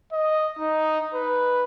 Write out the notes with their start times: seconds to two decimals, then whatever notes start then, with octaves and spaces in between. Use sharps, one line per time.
0.13 D#5
0.59 D#4
1.14 B4